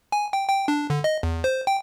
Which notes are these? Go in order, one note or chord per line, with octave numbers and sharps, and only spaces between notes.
G#5
G5
G5
D4
D3
D#5
E2
C5
G5